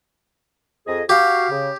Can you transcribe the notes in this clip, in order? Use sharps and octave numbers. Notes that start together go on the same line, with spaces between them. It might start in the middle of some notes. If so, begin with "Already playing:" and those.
F2 G#4 D#5
F#4 G4 F5
C#3